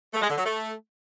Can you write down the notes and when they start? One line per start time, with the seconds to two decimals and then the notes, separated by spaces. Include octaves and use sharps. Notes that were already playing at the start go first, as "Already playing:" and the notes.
0.14 A3
0.22 G#3
0.29 D3
0.37 F#3
0.45 A3